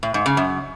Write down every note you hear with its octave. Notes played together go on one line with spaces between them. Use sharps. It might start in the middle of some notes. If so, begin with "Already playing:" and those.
A2
G#2
C#3
F#2